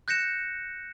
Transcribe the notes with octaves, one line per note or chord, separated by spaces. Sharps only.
F#6 G6 A#6 C#7 E7